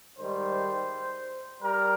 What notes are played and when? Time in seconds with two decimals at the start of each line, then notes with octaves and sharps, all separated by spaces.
0.19 G#2 D#3 G3 C5
1.62 G3 A#4